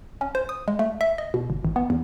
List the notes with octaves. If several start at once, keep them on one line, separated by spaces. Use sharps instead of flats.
C#4
C5
D#6
G#3
A3
E5
D#5
B2
G1
G#1
B3
E2